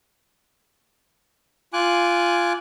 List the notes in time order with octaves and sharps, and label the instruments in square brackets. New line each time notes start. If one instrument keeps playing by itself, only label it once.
[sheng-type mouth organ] F4 G#5 D6 F#6